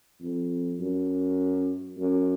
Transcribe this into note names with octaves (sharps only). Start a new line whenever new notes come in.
F2
F#2
F#2